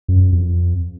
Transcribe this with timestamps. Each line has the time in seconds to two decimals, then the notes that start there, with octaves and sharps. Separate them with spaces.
0.08 F#2
0.20 F#2
0.32 F2